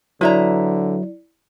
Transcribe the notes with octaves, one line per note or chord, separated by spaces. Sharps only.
D3 F#3 E4 B4 D5 E5 A#5